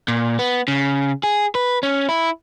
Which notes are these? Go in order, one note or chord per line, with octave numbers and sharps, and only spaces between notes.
A#2
B3
C#3
G#4
B4
C#4
E4